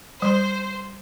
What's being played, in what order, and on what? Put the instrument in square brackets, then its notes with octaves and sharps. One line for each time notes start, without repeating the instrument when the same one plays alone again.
[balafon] G3 [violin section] C5